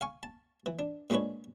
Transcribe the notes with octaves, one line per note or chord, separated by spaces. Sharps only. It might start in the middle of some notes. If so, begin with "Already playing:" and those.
F5 G#5 C#6
A5
E3
D4
A#2 G#3 C#4 D4 B4 C#5